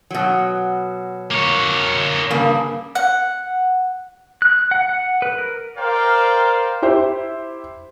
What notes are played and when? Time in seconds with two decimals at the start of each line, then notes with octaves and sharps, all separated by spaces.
0.11 B2 F#3
1.31 A#3 C#5
2.30 G2 C#3 A#3
2.95 F#5
4.42 F#6
4.71 F#5
4.89 F#5
5.22 B4
5.38 A#4
5.78 A#4 C5 D5 F5 G5
6.82 E4 G4 C5 E5